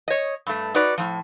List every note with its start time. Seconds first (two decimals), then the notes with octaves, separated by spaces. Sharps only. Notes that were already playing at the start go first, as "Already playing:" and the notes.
0.08 C#5 D#5
0.47 G2 A3
0.74 D#4 F#4 B4 D5
0.98 A2 F3